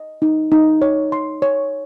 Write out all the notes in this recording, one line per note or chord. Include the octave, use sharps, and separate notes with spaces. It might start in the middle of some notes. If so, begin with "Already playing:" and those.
Already playing: D#5
D#4
D#4
C#5
C6
C#5